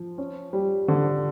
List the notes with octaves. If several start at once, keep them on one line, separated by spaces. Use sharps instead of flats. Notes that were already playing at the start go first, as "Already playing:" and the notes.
Already playing: F3
C#4
G3
D3